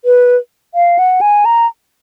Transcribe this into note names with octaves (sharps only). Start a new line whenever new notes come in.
B4
F5
F#5
G#5
A#5